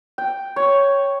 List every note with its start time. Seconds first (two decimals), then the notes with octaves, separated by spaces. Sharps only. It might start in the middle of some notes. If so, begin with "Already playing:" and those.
0.18 G5
0.56 C#5